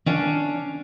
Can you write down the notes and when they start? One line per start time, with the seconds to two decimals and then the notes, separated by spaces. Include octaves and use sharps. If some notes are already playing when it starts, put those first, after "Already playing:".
0.06 C#4 D4 F5